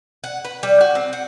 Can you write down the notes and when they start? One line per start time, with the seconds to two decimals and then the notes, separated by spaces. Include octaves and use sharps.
0.24 F#5
0.45 B4
0.63 G3
0.81 F#4
0.95 C4
1.13 F#5